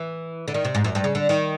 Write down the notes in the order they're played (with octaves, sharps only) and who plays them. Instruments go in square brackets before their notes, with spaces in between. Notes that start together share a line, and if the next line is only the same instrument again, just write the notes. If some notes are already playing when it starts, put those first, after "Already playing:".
Already playing: [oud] E3
D3
D#3
C3
G#2
F#2
G2
C#3
D3
D#3